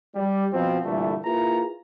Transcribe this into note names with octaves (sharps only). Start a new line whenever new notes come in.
G3
B2 F3 C4
G2 A#2 D3 E3 G3 A3
A#3 E4 F4 G#4 B4 A#5